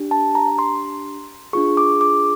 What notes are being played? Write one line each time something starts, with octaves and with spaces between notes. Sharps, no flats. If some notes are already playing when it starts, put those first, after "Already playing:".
Already playing: D4 G4
A5
A#5
C6
D4 F4 G#4 C#6
D6
D6